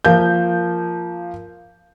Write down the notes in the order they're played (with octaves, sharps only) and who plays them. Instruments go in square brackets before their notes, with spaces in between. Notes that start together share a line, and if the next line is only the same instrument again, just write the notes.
[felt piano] F3 A#3 G6